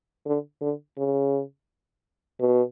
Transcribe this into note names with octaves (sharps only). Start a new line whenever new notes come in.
D3
D3
C#3
B2